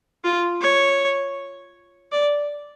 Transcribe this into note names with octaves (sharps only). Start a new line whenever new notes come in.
F4
C#5
D5